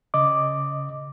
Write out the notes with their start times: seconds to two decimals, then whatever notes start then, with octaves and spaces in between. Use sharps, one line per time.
0.14 C#3 D#5 D6